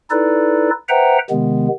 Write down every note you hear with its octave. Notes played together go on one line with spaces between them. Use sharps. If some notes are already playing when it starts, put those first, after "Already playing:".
D#4 E4 A4 B4 D5
B4 C5 E5 F#5 G5 A#5
C3 D#3 G#3 B3